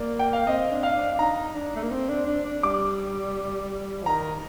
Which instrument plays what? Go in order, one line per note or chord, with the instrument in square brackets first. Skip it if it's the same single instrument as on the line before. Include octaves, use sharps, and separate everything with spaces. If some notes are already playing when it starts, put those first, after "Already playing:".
Already playing: [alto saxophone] A#3 [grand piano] D5
[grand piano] G5
F5
[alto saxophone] C4 [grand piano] D#5
[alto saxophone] D4
[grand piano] F5
[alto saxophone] D4
D4
[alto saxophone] D#4 [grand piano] A#5
[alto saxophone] D4
A3
A#3
C4
D4
D4
D4
[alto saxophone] G3 [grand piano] D6
[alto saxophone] F3
[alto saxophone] D#3 [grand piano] A#5